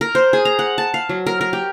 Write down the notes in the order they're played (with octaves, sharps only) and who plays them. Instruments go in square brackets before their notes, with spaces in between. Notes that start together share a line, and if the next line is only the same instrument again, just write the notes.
[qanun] A#4
C5
G#4
A#5
F#5
A5
F5
F#3
A#4
A#4
G4